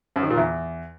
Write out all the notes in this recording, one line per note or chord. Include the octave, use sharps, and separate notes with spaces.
F#2
D#3
A#2
E2